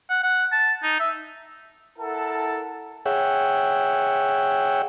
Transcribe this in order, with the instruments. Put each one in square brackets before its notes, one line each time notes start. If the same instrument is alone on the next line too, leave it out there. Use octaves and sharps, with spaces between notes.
[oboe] F#5
F#5
A5
D#4
E5
[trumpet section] E4 A4 A#4 F#5 A5
[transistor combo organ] G#4 C#5 E5 F#5 G5